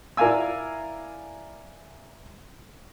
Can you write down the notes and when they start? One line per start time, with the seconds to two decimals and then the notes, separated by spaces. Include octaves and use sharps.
0.17 E4 A#4 D5 F5 G#5 E6